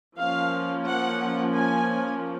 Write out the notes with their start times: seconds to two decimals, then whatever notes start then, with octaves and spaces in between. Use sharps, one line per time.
0.18 F3 A#3 C#4 F5
0.87 F#5
1.54 G#5